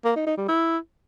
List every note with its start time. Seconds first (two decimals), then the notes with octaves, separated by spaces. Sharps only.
0.05 A#3
0.16 D#4
0.27 D#4
0.37 G3
0.48 E4